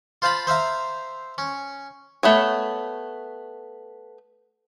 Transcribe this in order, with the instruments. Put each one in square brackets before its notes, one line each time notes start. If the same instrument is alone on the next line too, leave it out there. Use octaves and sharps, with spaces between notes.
[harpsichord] F4 C5 F5 A5 B5
C5 E5 F5 A#5
C#4
[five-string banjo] A3 B3 C#5